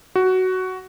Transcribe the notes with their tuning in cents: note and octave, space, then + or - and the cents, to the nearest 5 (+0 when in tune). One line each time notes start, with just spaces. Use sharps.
F#4 +10